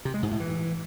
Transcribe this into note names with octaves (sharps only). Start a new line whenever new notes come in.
C3
G#3
G#2
A2
E3